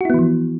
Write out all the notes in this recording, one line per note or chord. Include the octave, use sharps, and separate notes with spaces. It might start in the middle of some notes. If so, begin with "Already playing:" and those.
E3 F3 B3 E4 F#4